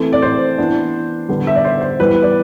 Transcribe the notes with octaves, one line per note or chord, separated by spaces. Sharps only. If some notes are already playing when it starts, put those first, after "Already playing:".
Already playing: E3 A3 C4
D5
C5
E3 B3 D4
D3 G3 B3 D4
E5
D5
C5
C5
E3 G3 B3 B4
D5